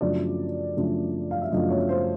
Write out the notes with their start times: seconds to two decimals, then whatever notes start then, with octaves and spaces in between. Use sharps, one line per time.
0.01 F#2 C#3 F3 A3 D4 D5
0.76 F#2 C#3 F3 A3 D4
1.31 F5
1.42 E5
1.51 F#2 C#3 F3 A3 D4 D#5
1.70 C#5
1.89 C5